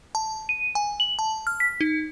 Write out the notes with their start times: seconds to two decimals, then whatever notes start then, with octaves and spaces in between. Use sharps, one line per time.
0.15 A5
0.49 D#7
0.75 G#5
1.00 F#7
1.19 A5
1.47 F6
1.60 B6
1.81 D#4